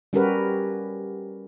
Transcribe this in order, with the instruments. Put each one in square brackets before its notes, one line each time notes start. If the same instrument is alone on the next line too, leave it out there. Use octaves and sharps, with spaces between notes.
[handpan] G3 C#4 F#4 G4 A#4 B4